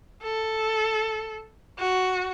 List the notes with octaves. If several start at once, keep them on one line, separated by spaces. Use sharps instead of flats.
A4
F#4